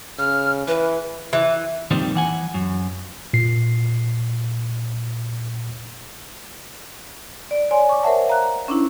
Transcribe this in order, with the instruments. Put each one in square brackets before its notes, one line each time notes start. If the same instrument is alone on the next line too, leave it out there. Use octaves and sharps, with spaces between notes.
[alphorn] C#3 [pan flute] F6
[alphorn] E3 [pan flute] B4
[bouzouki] E3
[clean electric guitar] F2 A#2 D#3 G3 C4
E3 F#5 G#5
F#2
[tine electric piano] A#2 C7
[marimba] D5
C#5 D5 G#5 C6
C#6 D6
A#4 C5 C#5 E5 F#5 A5
F5 A#5 F#6
C#4 D4 E4